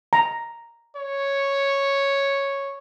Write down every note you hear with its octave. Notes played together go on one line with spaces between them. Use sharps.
A#5
C#5